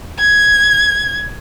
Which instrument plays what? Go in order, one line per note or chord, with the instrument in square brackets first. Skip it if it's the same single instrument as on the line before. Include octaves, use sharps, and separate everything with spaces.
[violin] G#6